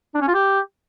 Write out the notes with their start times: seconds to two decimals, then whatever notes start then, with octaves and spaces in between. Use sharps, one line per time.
0.15 D4
0.21 C#4
0.28 F4
0.34 G4